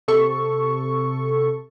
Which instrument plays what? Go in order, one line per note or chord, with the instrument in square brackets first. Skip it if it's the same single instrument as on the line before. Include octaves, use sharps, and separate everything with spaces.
[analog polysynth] C3 A4 C#6